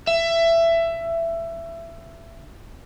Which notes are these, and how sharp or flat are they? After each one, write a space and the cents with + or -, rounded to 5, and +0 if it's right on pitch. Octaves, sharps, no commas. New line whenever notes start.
E5 +20